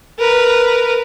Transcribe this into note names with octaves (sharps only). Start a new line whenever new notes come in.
A#4 B4